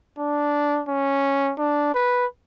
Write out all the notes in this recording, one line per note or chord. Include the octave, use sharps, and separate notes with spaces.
D4
C#4
D4
B4